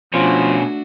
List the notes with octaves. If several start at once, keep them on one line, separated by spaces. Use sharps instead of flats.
B2 F3 A3 C#4 D4 F#4